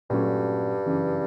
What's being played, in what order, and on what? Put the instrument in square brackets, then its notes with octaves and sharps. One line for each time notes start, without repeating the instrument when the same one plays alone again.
[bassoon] G2 [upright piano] A#2 F#3 A3 C#4 F#4
[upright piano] F#2 C#3 E3